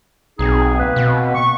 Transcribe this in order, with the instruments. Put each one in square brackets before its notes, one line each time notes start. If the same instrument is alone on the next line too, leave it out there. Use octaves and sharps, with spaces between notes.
[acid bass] B1 [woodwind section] C4 D#4 G#4
[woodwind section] A#3 C4 B4
[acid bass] B2
[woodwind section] C#6